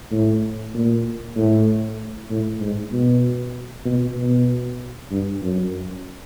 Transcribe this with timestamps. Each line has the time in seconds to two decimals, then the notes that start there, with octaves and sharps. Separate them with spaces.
0.11 A2
0.74 A#2
1.36 A2
2.30 A2
2.61 G#2
2.92 B2
3.85 B2
4.17 B2
5.11 G2
5.42 F#2